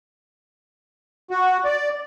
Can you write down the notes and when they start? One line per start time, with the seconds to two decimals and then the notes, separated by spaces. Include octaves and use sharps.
1.31 F#4
1.65 D5